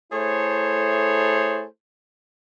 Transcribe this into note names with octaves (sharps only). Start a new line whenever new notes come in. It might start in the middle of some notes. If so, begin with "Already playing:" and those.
A3 E4 G#4 A4 C5 C#5